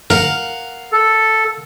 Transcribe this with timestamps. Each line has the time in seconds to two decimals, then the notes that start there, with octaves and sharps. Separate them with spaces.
0.10 A#4 F5 F#5
0.92 A4